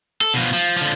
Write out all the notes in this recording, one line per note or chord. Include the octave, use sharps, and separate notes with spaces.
A4
B2 F3
F3
D3 F3